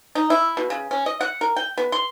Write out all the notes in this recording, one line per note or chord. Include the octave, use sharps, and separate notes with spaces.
D#4
E4
B2
C#3
C#4
D#5
F#5
A#4
G5
B3
C6